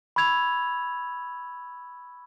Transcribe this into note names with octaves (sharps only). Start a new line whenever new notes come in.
B5 C#6 E6 G#6 F7